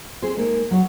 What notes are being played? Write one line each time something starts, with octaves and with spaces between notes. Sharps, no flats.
C4 G#4 C5
G#3 A#3 D#4
F#3 F#4 C#5